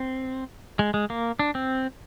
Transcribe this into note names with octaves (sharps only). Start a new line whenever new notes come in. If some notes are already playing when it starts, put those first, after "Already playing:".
Already playing: C4
G#3
G#3
A#3
D4
C4